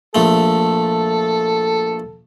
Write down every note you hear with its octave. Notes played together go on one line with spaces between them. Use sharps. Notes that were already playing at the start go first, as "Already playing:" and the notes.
A#1 A3 A4